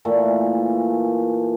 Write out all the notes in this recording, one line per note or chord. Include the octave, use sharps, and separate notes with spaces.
A#2 E3 A3 E5